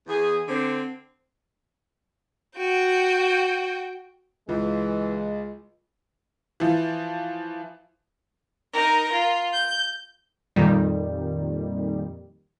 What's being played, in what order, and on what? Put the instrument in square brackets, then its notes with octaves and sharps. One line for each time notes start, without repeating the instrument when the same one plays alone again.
[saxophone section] E2 G#4
D3 C4
[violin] F#4 G5
[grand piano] C#2 [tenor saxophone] E3 [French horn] G#3 [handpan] F4
[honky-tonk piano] E3 F3
[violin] D#4 A#4
F4
G6
[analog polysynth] F2 A#2 D#3 G3